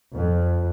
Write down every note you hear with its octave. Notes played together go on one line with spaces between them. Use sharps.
F2